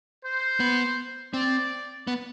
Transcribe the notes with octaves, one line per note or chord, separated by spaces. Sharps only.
C5
B3
C4 D5
B3